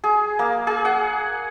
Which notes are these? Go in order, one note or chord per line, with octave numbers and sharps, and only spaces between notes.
G#4
A#3
G#4
F#5